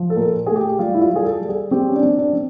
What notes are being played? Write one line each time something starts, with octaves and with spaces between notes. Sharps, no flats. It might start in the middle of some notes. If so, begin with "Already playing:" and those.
Already playing: F3
A4
A#2 A#4
A4
A3 G#4
G4
G3 F4
E4
F4
G3
G#4
A4
G3
G#4
C4 G4
C#4
D4
C4
D4
C4